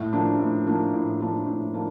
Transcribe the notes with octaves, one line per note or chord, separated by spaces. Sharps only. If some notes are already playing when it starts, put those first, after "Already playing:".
Already playing: A2
F3 A#3 D4
A2
F3 A#3 D4
A2
F3 A#3 D4
A2
F3 A#3 D4